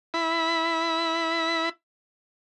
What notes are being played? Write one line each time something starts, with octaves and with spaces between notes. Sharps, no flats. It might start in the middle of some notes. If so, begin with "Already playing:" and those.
E4 B5